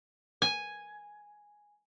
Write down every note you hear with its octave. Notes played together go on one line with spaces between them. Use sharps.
G#5